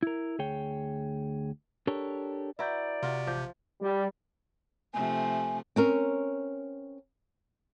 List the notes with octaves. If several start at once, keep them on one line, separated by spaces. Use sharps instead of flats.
E4 A#4
D2 G#4 C#5 G5
D4 G4 A4 A#4 C#5
E4 F#4 B4 D5 A#5 G6
C3 F4 F#4
A1 F3 D6 G6
G3
C3 F3 A3 G#5
C4 C#4 A#4